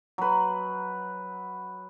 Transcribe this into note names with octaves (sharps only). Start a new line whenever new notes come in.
F#3 B4